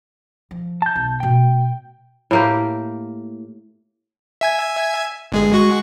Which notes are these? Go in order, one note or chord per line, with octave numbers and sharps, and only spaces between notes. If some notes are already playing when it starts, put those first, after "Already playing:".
F3
A5 G6
B1
B2 A3 G5
A2 A#3 G4
E5 G#5 G#6
G1 G#3 G#4
G#3 F#4 C#6